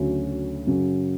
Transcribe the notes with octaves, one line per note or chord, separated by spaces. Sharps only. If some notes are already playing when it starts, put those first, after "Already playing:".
Already playing: D2 C#3 F#3 C#4
F#2 C#3 F#3